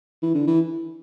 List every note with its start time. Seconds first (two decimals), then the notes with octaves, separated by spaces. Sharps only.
0.23 E3
0.35 D3
0.47 E3